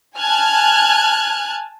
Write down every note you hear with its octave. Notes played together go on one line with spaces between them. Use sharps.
G#5 A5 F6 F#6 G#6